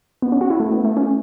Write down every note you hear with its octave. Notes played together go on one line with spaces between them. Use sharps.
B3
C#4
F#4
E4
A3
B3
A3
C#4